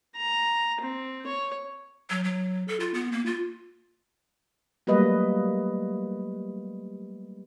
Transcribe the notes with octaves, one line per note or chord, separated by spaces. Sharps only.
A#5
C4
C#5
F#3
F#3
A4
F4
B3
A#3
F4
F#3 G3 A3 A#3 B4 D#5